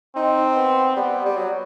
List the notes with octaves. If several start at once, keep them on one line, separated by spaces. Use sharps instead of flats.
C4 D#4
B3
G3 B3
G3
F#3